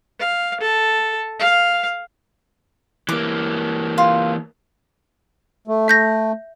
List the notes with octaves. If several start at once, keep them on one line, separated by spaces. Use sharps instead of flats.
F5
A4
F5
E3 A#3 D6
F4
A3
E5 G6 A#6